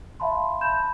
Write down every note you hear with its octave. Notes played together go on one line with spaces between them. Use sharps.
E5 F5 A5 B5 C6
A5 B5 G6 E7